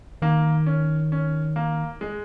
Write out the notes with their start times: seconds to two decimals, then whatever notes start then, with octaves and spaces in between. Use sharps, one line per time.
0.22 D#3 A#3
0.66 C#4
1.12 C#4
1.56 A#3
2.01 G#3